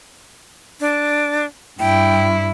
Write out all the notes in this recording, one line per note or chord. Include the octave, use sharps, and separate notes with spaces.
D4
G2 E4 G5